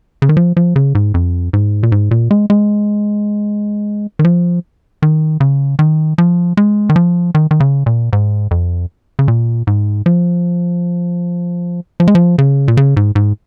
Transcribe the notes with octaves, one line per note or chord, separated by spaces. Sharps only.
C#3
D#3
F3
F3
C#3
G#2
F2
G#2
A#2
G#2
A#2
G#3
G#3
D#3
F3
D#3
C#3
D#3
F3
G#3
D#3
F3
D#3
D#3
C#3
A#2
G#2
F2
C#3
A#2
G#2
F3
F3
G#3
F3
C#3
A#2
C#3
G#2
G#2